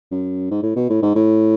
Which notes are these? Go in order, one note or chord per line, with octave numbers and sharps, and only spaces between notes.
F#2
G#2
A2
B2
A2
G#2
A2